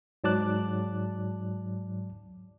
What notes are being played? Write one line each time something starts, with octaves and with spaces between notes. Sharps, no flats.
G#2 F#3 D5 A5 D6 F#6